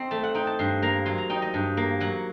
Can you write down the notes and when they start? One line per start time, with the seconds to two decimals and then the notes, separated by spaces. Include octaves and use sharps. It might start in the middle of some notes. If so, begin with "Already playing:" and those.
Already playing: C4 D#4
0.11 A3 A5
0.24 F#5
0.34 D#4 G5
0.47 A5
0.59 G2 C6
0.82 A#3 A#5
1.06 F#3 C6
1.18 A#5
1.30 D#4 G5
1.42 D#5
1.54 G2
1.77 A#3
2.00 F#3 F#5